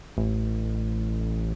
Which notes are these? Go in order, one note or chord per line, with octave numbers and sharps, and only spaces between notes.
A1